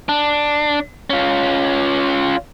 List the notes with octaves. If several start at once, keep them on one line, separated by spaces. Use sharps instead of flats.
D4
C#4 F4